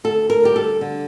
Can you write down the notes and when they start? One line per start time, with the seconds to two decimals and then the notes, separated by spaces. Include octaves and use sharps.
0.04 D2 A4
0.30 A#4
0.43 G3 G4
0.56 A4
0.81 D3